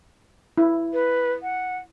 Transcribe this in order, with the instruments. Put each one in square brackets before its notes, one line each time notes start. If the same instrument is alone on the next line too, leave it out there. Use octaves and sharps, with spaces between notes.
[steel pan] E4
[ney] B4
F#5